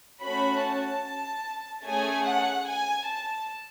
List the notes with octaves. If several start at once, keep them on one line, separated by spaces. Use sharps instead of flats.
A3 C#4 F#4 B5
A5
A3 C#4 G#4 G#5
F#5
G#5
A5